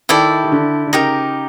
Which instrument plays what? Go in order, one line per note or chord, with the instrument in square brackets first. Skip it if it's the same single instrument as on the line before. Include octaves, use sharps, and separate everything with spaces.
[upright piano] D#3 [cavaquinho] E4 A4 D5 G5
[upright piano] D#3
D3
D3
[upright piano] C#3 [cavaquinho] D#4 G4 A#4